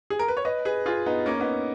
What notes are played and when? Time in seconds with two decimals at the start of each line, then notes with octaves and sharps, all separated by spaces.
0.10 G#4
0.19 A#4
0.28 B4
0.37 C#5
0.45 B4 D#5
0.65 G#4 B4
0.86 F4 G#4
1.06 B3 D#4
1.26 A#3 C#4
1.40 B3 D#4